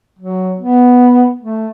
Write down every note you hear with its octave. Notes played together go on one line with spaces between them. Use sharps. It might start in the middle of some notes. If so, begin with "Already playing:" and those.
F#3
B3
A3